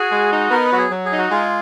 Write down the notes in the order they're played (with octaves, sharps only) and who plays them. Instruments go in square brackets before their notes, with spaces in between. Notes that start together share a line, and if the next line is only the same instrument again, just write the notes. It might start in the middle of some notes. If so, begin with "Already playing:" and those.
Already playing: [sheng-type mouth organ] F#4 [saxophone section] G#4
[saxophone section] G#3
D#4
[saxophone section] B3 [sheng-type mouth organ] A#4
[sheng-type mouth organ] B4
[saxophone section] F#3 [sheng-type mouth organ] F#4
[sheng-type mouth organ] G#4
[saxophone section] F#3
[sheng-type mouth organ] G#4
[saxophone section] D#4
[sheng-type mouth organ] F#4
[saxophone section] G#3 [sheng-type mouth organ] F4